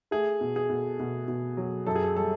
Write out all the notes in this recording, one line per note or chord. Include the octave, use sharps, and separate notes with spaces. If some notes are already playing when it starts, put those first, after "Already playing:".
A3 G#4
B2
G#4
B2
B2
B2
F#3
F#2 A4
G#4
A4
G3 A4